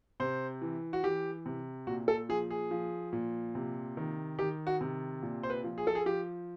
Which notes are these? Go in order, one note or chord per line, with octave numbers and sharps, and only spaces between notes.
C3 C5
E3
F#4
E3 G4
C3
A#2 F#4
A4
F3 G#4
G#4
F3
A#2
C3
D#3
D#3 G4
F#4
C3
A#2
C5
B4
F3
G#4
A4
G#4
F3 G4